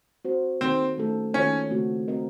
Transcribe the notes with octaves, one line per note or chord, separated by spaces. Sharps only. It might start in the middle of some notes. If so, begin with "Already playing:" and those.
C4 F#4 C5
D#3 A#3 C4 D#4 A4
D#3 A3 C#4 A4
D#3 A#3 C#4 F4 A4 C#5
C#3 A3 C4 F#4
C4 F#4 A#4 D#5